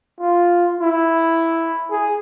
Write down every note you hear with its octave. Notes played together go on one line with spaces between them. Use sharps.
F4
E4
G#4